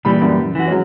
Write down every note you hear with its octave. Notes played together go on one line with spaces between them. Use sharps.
A#2 E3 G3 B5
F#2
E3 F#4
F#3 G#3 C#4